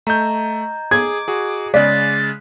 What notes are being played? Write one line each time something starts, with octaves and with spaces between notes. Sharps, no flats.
A3 D#5 A#5 G6
G#4 D6 G#6
F#4 G#4
C#3 G#3 D5 F#6 A6 B6